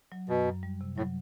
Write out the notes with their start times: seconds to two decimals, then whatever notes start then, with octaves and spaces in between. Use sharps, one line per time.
0.12 F#3
0.29 F#2 B2
0.46 F#2
0.63 G3
0.81 C3
0.97 A2 F#3